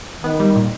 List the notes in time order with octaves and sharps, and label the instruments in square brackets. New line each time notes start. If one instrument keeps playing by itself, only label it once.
[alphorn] D#3 [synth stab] B3
[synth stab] G3
A#2